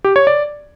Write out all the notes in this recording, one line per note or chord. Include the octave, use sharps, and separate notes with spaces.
G4
C#5
D5